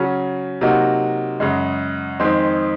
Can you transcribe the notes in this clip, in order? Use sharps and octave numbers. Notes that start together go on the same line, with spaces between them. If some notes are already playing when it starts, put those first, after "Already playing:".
Already playing: C#3 F#3 C#4
C3 F#3 A#3 D#4 F#4
F#2 C#3 G#3
F2 D#3 G#3 C4 D#4